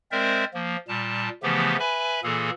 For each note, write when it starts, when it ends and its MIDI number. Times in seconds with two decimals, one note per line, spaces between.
0.12 0.44 56
0.12 0.44 60
0.12 0.44 70
0.12 0.44 72
0.12 0.44 74
0.12 0.44 76
0.54 0.76 53
0.54 0.76 58
0.88 1.29 46
0.88 1.29 55
0.88 1.29 81
1.43 1.77 49
1.43 1.77 52
1.43 1.77 53
1.43 1.77 57
1.43 1.77 59
1.43 1.77 67
1.80 2.20 71
1.80 2.20 76
1.80 2.20 80
1.80 2.20 83
2.23 2.50 46
2.23 2.50 52
2.23 2.50 58
2.23 2.50 68
2.23 2.50 69